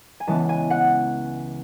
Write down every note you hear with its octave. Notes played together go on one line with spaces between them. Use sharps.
G#5
C#2 C#3 E3 G#3 B3 A5
G#5
F#5